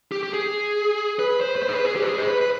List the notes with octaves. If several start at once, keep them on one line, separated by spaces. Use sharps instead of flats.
G4
G4
G#4
B4
C5
B4
C5
G#4
B4
G#4
G4
B4
G#4
C5
B4
B4